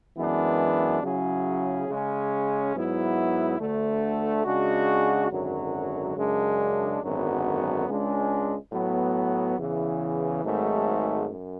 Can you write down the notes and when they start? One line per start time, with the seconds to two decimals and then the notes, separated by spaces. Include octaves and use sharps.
0.17 F#2 E3 G#3 B3 D4
1.03 C#3 F#3 C#4 E4 G#4
1.88 C#3 G#3 C#4
2.74 G#2 F#3 B3 E4
3.59 D2 D3 A3
4.44 C#3 G#3 D4 F#4
5.30 G#1 F#2 D3 F#3
6.16 F#2 C#3 G#3 D4
7.02 G#1 F#2 D3 F#3 B3
7.87 C#2 C#3 G#3 D4
8.73 A2 F#3 B3
9.58 E2 C#3 E3
10.44 G#1 G#2 F#3 A3
11.29 F#2